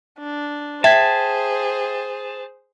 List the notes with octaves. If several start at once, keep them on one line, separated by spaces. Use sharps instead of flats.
D4
G#4 C5 E5 G5 A5 G#6 B6